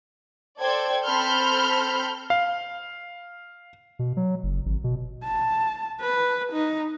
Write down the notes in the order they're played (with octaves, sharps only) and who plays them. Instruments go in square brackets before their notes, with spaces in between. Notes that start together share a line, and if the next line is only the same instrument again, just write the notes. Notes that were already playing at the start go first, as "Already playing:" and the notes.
[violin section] A4 C5 D5 G5 G#6
C4 A4 B5 C6 F6 G6
[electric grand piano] F5
[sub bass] B2
F#3
F#1
G#1
B2
[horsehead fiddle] A5
B4
D#4